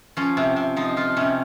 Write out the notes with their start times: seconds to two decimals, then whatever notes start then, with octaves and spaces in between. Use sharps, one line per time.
0.17 F3 C#4
0.37 C3
0.56 C3
0.77 F3 D#4
0.96 F3 F4
1.17 C3 C#4